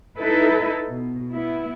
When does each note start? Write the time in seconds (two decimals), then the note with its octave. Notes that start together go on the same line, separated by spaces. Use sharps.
0.18 D#4 E4 A4 B4
0.89 B2
1.32 B3 E4